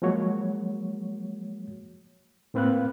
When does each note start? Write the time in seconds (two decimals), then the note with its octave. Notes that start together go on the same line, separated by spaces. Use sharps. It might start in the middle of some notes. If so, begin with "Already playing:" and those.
0.02 F3 F#3 G#3 A#3 F#4 C#5
2.54 A2 A#3 C4 B4 F5 F#6